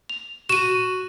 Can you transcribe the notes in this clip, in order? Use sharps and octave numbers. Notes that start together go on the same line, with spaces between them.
F7
F#4 D#7 E7